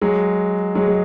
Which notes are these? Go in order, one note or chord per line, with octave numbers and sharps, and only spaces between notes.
F#3 G#3
F#3 G#3
G#3